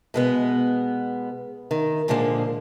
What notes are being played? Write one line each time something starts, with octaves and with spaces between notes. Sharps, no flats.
B2 G#3 B3
D#3
A#2 D3 F3 G#3 A#3